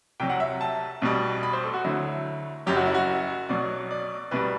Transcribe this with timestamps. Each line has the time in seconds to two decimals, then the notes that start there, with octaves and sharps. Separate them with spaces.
0.20 C2 C3 F#3 G5
0.30 F#5
0.40 E5
0.61 A5
1.02 B1 B2 G3
1.43 B5
1.53 C5
1.64 A4
1.74 F#4
1.84 D2 D3 F#3 E4
2.67 F#1 F#2 F#3 G4
2.76 F#4
2.86 E4
2.95 F#4
3.49 B1 B2 F#3 D5
3.91 D5
4.31 C2 B2 G3 B4